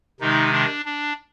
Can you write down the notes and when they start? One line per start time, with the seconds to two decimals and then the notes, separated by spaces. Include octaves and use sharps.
0.20 C3 D#3 G#3 D#4
0.52 D4
0.85 D4